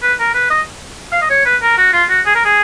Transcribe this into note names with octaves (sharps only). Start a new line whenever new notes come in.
B4
A#4
B4
D#5
F5
D#5
C#5
B4
A#4
F#4
F4
F#4
G#4
A#4
G#4